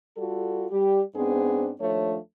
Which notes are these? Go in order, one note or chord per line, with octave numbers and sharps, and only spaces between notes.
G3 F4 F#4 A4
G3 G4
G#2 B3 C4 D4 G#4 C5
D#2 F3 A3 D4 C#5